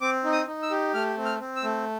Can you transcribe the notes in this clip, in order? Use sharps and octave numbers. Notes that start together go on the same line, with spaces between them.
C4 D6
D#4
D#6
D#4
E6
G4
A3 F6
C4
F6
C4
E6
A3